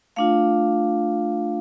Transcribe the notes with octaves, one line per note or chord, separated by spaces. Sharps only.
A3 D4 F4 F5